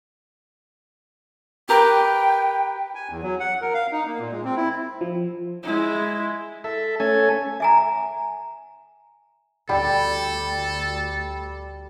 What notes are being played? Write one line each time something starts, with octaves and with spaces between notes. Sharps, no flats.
G4 A#4 B4 G5
G#5
E2
F#3
F#5
A#4
F5
D#4
A#3
A#2
G#3
C4
E4
F3
G#3 E4
A4 E5
A3 C#4 A4 G#5
E5 G#5 A#5
D2 G3 A4 G5